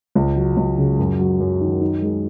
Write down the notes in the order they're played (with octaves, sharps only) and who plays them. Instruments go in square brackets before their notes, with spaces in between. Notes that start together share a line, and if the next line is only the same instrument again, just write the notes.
[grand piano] C#2
F#3
C#2
C#3
F#2
F#3
F#2
D#3
D#4
G#3